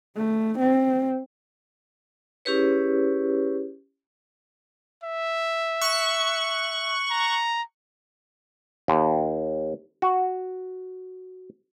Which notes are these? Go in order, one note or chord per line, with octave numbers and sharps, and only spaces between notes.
A3
C4
C#4 E4 G4 G#4 B4 C#5
E5
C#6 F#6
A#5
D#2
F#4